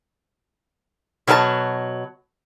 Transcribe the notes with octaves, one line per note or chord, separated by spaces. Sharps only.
B2 F#3 F#4 A#4 A5